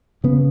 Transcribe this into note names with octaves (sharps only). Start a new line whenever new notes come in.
C#3 B3